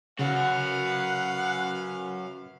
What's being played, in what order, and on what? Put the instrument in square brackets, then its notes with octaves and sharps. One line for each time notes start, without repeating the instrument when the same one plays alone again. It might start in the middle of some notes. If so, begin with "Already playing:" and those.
[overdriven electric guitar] F#2 F#4 [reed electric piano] C#3 [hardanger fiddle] B4 F5 [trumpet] F#5